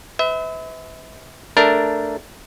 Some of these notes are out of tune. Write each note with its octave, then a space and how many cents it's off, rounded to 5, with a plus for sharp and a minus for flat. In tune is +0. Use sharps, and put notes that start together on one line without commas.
B4 +35 E5 -35
A3 +5 D4 +0 A#4 +0